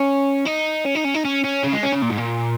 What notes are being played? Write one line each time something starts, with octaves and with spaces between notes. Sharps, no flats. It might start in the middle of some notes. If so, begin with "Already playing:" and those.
Already playing: C#4
D#4
C#4
D#4
C#4
D#4
C#4
C#4
C#3
G#3
C#4
C#3
A#2
G#2
A#2